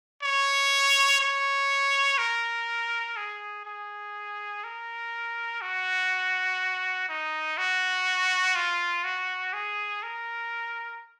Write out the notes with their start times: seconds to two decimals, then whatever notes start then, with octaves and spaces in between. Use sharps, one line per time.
0.23 C#5
1.21 C#5
2.18 A#4
3.17 G#4
3.66 G#4
4.64 A#4
5.61 F#4
7.09 D#4
7.58 F#4
8.56 F4
9.05 F#4
9.53 G#4
10.03 A#4